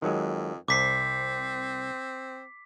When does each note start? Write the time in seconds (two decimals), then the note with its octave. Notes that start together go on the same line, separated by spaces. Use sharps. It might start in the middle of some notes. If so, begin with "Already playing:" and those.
0.02 F2 D#3 F#3 G#3
0.68 C2 C4 D6 B6 C7